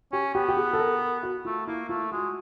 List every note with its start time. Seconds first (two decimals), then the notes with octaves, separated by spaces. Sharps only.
0.12 C#4 G4
0.35 B3 G4
0.48 G4
0.57 G#4
0.73 A4
0.79 A#4
1.23 F#4
1.45 A3 F4
1.67 A#3 E4
1.89 A3 F4
2.11 G#3 F#4